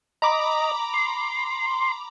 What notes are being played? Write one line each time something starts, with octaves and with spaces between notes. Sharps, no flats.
D#5 A#5 B5 D6
C6